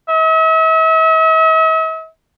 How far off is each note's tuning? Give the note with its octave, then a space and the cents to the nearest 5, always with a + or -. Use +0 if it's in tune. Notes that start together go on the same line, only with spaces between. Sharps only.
E5 -45